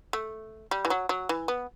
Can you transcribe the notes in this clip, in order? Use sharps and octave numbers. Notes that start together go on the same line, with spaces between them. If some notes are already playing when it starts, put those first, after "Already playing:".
A3
G3
E3
F#3
F#3
E3
B3